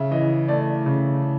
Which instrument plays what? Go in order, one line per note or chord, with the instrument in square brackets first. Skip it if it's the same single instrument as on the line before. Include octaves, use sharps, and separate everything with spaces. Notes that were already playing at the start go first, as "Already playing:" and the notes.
Already playing: [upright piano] C#3 E5
E3 D#5
A3 D5
C#3